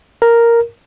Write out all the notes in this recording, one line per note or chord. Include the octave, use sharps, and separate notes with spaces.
A#4